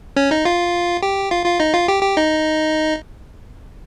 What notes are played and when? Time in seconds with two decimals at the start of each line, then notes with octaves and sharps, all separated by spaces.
0.16 C#4 C#5
0.31 D#4 D#5
0.45 F4 F5
1.03 G4 G5
1.31 F4 F5
1.45 F4 F5
1.60 D#4 D#5
1.74 F4 F5
1.88 G4 G5
2.03 G4 G5
2.17 D#4 D#5